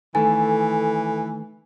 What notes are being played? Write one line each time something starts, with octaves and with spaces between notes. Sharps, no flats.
D#3 E3 A3 A4 G#5